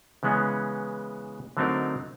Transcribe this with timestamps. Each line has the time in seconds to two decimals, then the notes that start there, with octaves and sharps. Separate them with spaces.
0.23 C#3 E3 G#3 B3 C#4
1.57 D3 F#3 A3 C4 D#4 A#4